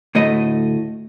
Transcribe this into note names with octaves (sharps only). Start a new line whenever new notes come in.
D2 A2 A3 D#5